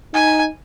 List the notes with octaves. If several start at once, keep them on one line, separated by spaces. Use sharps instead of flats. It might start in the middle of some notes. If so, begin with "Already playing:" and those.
D#4 G#5